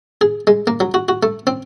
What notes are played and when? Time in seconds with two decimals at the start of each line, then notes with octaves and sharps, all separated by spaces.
0.21 G#4
0.47 G#3
0.67 A#3
0.80 F#3
0.94 F#4
1.09 F#4
1.23 A3
1.47 C4